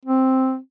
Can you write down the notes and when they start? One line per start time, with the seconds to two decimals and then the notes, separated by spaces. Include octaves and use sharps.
0.05 C4